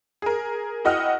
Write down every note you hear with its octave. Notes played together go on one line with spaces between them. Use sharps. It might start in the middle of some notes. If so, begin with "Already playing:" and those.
G#4 A#4
E4 F#4 D#5 F#5 G5 F6